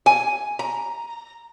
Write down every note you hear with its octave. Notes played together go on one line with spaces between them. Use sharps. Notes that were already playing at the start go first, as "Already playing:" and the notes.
G#5
A#5